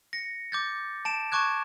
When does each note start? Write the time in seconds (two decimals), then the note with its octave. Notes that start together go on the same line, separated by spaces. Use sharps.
0.13 A#6 C#7
0.52 D6 G6 A6
1.05 A5 D7 E7
1.32 A5 C#6 D6 F#6 G#6